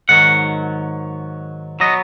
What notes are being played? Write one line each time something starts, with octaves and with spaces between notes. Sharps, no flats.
G#2 D#3 F#3 F#5
F#3 B3 D#5